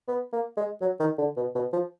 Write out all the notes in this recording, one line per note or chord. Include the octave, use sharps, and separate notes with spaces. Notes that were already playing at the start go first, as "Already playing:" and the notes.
B3
A#3
G#3
F#3
D#3
D3
B2
B2
F3